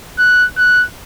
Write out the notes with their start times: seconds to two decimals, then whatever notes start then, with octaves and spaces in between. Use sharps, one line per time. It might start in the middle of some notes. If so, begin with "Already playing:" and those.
0.19 F#6
0.58 F#6